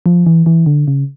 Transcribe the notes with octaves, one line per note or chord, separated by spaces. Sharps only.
F3
E3
E3
D3
C#3